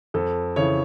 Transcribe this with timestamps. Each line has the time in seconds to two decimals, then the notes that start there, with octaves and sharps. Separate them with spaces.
0.14 F2 A4
0.56 C#3 E3 C#5